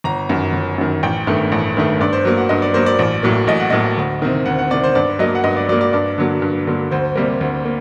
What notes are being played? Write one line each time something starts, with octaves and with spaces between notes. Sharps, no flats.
G1 A#5
F#2 D#3
G1
F#2 D#3
A1 G5
G2 D#3 A3
A1
G2 D#3 A3
G2 D5
C5
F#3 A#3
F#5
G2 D#5
D5
F#3 A#3 C5
D5
A1
A2 F#3 A#3
A1 D#5
F#5
A2 F#3 A#3 D#5
D2
C3 D#3
D2 F#5
F#5
C3 D#3 D5
C5
G2 D5
F#3 A#3 D#5
F#5
G2 D#5
D5
F#3 A#3 D5
D5
G2 D5
D3 F#3 A#3
G2
D3 F#3 A#3
D2 C5
C3 G3 A#3
D2
A#3